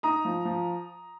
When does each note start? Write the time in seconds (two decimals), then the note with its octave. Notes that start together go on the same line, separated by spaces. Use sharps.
0.03 D#4 A#5 D#6
0.25 F3
0.45 F3